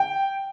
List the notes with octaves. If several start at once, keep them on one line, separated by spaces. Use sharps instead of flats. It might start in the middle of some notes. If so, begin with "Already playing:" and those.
Already playing: G5